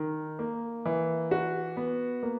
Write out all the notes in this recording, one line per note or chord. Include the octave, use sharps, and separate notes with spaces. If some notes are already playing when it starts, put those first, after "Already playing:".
Already playing: D#3
A#3
E3
F#4
B3
A#3